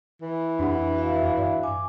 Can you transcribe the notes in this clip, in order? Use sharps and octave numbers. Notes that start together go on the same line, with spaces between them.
E3
F2 D4 G4 F#5
F#4 E5 F5
G2 D5
G#5 D6